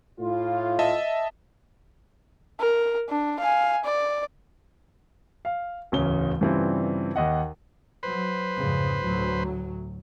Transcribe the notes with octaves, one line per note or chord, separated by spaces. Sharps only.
A2 F4
D#5 E5 A5
A#4
D4
F5 G#5
D5
F5
D1 E2 C#3 C#4 G7
G2 C#3 E3 G3 C4 F4
D#2 D#5 F#5
F#3 B4 C5
F2 G#2 C#3
D2 A2 F#3